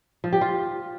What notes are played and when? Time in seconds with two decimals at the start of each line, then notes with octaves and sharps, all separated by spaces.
0.24 F3
0.33 G4
0.41 F4